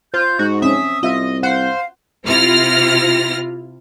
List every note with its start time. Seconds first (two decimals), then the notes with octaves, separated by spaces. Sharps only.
0.14 F4 C5 G6
0.39 G#2 F#4
0.62 C4 C#4 E5 D#6
1.03 C2 F4 D#5 E5
1.43 C5 F5 F#5
2.25 C3 E4 F4 F6 A#6